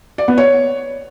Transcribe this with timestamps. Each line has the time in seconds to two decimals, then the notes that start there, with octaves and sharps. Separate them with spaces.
0.18 D5
0.28 B3
0.38 C#5